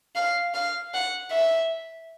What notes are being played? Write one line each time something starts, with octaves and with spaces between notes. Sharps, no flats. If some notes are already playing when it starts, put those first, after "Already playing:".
F5
F5
F#5
E5